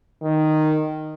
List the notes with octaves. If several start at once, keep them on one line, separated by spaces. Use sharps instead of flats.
D#3